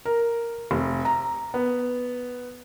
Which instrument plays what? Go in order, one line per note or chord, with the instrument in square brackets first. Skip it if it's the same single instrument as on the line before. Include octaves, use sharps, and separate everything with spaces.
[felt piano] A#4
F1
A#5
B3